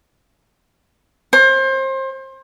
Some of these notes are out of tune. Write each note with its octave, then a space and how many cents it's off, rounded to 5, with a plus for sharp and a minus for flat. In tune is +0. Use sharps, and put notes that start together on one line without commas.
C5 +30